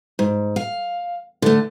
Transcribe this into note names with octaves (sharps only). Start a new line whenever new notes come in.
G#2
F5
D3 A3